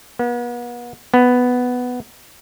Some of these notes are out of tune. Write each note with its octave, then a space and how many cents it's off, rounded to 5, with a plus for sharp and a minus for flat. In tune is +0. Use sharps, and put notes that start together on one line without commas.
B3 -40
B3 +5